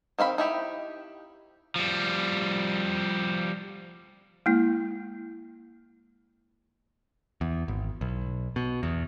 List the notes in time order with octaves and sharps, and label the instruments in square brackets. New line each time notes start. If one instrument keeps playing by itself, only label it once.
[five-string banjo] D#3 C4 F5 B5
D#4 E4 G4
[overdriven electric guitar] F3 G3
[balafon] G#3 A#3 E4
[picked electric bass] E2
G#1
B1
B2
E2